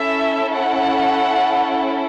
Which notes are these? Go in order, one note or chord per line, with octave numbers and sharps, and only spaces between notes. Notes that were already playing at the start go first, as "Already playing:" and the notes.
Already playing: C#4 E4 A4 E5
F#5